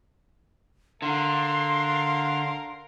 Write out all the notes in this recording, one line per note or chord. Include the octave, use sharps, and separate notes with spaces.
D3 A#4 F5 C6